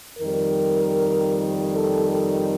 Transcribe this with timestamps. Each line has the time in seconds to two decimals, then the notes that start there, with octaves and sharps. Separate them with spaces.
0.18 F2 D#3 G3 A#4
1.73 A4
2.11 A4